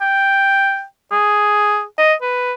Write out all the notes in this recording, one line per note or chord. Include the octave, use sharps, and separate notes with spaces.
G5
G#4
D#5
B4